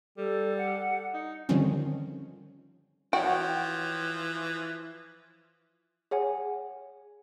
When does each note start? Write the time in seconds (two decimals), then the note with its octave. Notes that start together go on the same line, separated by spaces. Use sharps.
0.17 G3 A4
0.58 F#5
1.14 D#4
1.49 D3 D#3 F3 G3 C4 C#4
3.13 E3 F3 F#4 C#5 G5
6.11 G#4 C#5 F#5 G#5